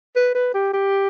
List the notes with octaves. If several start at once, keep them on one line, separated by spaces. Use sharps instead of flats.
B4
B4
G4
G4